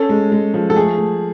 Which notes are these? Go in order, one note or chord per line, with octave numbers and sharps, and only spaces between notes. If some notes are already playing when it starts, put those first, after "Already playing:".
Already playing: C#4 A4
G#3
G#3
F3
A4
A3 G#4
A3